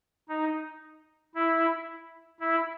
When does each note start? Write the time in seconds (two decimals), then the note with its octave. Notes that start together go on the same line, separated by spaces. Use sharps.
0.29 D#4
1.35 E4
2.40 E4